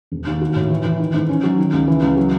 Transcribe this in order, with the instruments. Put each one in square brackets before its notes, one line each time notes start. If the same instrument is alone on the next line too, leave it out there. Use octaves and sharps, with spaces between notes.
[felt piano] E1
D#2
F#4
A2
E3
E3
D#3
G#2
C#4
F#3
D#3
C#2
E3
C#2
F#3